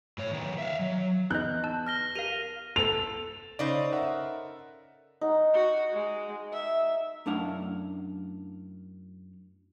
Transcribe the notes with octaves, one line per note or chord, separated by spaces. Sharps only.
A2 C#5
D#3 B3
E5 F5
F#3
E2 D#4 D#5 F#6 G6
A5 E6
F6 A#6 G7
G4 A#4 F5 D#7 F7
A4 F7
C#3 D#4 C5 D5
A#4 E5 F#5
D#4 F#5
F#4
G#3
E5
F#2 A3 D4 E4 F5 F#5